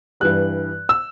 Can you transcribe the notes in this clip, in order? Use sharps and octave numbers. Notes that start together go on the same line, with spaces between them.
G2 E3 G3 F#6
E6